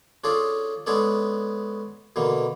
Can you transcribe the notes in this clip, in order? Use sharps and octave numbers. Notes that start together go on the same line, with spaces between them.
C#4 D4 F4 G#4 A4 D5
G#3 B3 C#4 G#4 A4 D5
B2 D3 E3 A#3